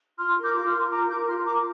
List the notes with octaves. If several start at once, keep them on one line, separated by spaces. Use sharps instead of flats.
F4 C6 F6
A#4
D6 G6
F4 D6
C6 F6
A#4
F4 A#5 D6
A#4 D6 G6
F4 C6 F6
A#4 A#5 D6